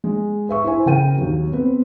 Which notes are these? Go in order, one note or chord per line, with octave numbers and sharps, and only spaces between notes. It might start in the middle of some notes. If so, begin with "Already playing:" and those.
G#3
B4 E5 C#6
E4 C5 G#5
C#3 A#4 G5 D#7
D#2 F#3
B3 C4 B4